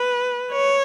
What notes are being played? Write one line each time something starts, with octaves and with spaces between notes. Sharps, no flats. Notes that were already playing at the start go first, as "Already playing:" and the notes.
Already playing: B4
C#5